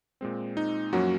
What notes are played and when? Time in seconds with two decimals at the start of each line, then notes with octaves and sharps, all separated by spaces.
0.21 A#2 G#3 C4
0.57 D#4
0.93 F#2 F3 F#3 A#3 C#4 F#4